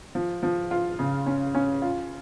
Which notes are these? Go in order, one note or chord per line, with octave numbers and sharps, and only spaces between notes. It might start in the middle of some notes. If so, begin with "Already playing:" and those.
F3
F3
F4
C#3
C#4
C#4
F4